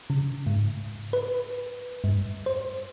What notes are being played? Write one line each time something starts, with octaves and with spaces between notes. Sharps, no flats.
C#3
G#2
B4
G2
C5